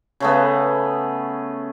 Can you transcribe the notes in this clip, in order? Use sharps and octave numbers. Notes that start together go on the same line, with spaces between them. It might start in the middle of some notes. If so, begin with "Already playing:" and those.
C#3 A3 B3